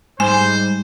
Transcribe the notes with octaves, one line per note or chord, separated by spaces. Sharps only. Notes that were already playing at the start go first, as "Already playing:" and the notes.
G#2 G3 G#3 C5 G#5